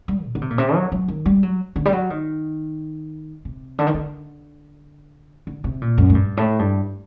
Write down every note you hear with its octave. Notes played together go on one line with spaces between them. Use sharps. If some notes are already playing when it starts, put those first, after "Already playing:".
G3
A#2
D3
C3
A#2
C3
F#3
F#3
D#3
G3
F#3
D3
G3
F#3
D#3
C3
D3
D#3
D3
D3
C3
A#2
F#2
A2
G2
A2
G2